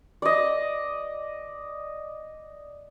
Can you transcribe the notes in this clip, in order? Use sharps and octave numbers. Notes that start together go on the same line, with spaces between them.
D5 D#5